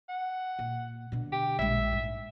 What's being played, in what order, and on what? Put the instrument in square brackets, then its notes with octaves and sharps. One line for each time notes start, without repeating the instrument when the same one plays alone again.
[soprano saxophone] F#5
[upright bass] A#2
B2 D3
[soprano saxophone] G4
[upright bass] A#1 G#3 [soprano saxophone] E5
[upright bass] G#2